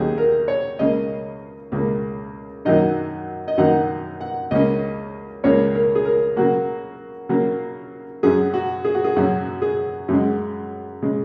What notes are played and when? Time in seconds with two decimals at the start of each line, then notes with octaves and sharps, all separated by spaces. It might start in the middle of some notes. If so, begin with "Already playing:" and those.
Already playing: D#2 D#3 F#3 C#4 G#4
0.18 A#4
0.48 C#5
0.79 C#2 C#3 A#3 D#5
1.72 C#2 C#3 A#3
2.65 F#2 D#3 F#3 A#3 D#4 D#5
3.48 D#5
3.58 F#2 D#3 F#3 A#3 D#4 F#5
4.21 F#5
4.51 C#2 C#3 A#3 C#4 D#5
5.44 C#2 C#3 A#3 C#4 C#5
5.75 A#4
5.95 G#4
6.05 A#4
6.36 C#3 F#3 A#3 F#4
7.29 C#3 F#3 A#3
8.23 F#2 F#3 C#4 G#4
8.54 F#4
8.85 G#4
8.95 F#4
9.04 G#4
9.16 F#2 F#3 C#4 F#4
9.62 G#4
10.08 F#2 C#3 G#3
11.02 C#3 G#3